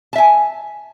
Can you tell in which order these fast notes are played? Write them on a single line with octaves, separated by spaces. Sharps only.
A5 E5 G#5